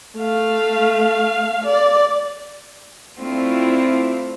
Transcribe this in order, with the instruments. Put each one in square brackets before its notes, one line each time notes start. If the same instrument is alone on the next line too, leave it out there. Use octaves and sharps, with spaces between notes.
[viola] A3 F5
D5
[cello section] A3 C4 D4 E4 F4